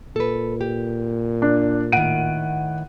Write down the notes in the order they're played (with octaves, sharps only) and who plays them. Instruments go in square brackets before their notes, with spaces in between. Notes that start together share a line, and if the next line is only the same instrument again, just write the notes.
[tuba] A#2 [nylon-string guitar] A4 B4
[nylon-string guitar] G4
[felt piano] D4
[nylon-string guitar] A2 D#3 [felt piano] F#5 D7 D#7